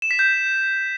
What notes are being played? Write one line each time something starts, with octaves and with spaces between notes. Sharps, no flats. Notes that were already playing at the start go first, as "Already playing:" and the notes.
E7
B6
G6